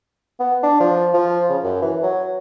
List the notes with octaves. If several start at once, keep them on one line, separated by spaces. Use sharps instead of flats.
B3
D4
F3
F3
C#3
F#2
E3
F#3